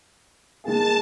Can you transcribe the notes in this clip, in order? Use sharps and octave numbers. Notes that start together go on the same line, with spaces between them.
G#3 A#3 G#4 A5